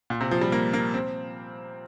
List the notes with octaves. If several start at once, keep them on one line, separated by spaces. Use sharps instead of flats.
A#2
C3
F3
G3
A#3
A#3
C4